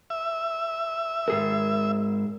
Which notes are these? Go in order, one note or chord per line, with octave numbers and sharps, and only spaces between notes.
E5
G#2 G#4 A#4